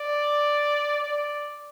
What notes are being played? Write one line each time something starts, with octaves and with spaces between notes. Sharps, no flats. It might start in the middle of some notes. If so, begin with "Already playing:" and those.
Already playing: D5
D5